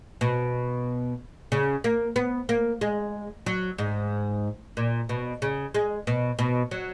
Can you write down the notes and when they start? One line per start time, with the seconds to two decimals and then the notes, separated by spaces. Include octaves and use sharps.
0.21 B2
1.52 C#3
1.84 A#3
2.16 B3
2.49 A#3
2.81 G#3
3.46 F#3
3.78 G#2
4.77 A#2
5.09 B2
5.42 C#3
5.75 G#3
6.07 B2
6.39 B2
6.71 F#3